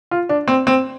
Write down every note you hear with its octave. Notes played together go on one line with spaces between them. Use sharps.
F4
D4
C4
C4